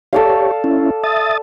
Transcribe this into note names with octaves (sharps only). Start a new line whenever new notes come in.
G4 A4 C#5 D5 F5
C#4 E4
E5 D#6 A6